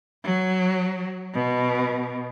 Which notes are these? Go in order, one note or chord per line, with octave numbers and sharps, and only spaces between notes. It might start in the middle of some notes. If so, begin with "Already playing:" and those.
F#3
B2